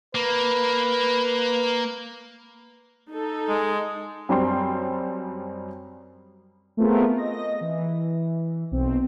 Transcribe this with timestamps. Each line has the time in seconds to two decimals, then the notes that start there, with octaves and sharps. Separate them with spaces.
0.15 A#3 B4
3.10 D#4 A4
3.49 G#3
4.29 F#2 G3 C4 C6
6.77 A3 B3 C4 F4 G#4 A#4
7.18 D#5 A#6
7.61 E3
8.71 B1 C4